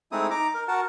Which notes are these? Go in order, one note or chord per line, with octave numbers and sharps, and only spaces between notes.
G#3 A3 C4 D#4 E4 D#6
D#4 A#5 D6
A#4
F#4 A#4 F#5 A5